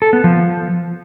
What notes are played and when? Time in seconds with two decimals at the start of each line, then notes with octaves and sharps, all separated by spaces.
0.02 A4
0.13 B3
0.24 F3